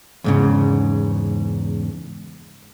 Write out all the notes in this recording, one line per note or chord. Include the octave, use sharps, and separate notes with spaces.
E2 G#2 C#3